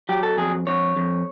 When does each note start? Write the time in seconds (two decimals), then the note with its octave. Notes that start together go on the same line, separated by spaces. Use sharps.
0.09 F#3 G4
0.23 A4
0.37 F2 G#4
0.67 F2 C#5
0.96 F2